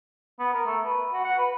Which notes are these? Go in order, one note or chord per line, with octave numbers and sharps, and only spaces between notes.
B3
A#4
A3
B4
F#4
F#5
B4